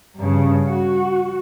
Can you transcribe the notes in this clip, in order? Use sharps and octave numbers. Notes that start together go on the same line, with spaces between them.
G2 C#3
F#4